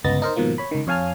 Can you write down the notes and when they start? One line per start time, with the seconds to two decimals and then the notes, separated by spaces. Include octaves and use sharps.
0.04 G1 C#2 B3 D#5 A6 A#6
0.22 D#4 A#4 C5
0.36 G#2 B2 D#3 F3 A#3
0.58 C#5 B5
0.71 C#2 D#3
0.87 F2 C#5 F5 G#5 A5 F6